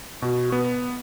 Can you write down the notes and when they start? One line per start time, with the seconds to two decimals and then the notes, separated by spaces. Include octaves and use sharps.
0.22 B2 F#4
0.52 B3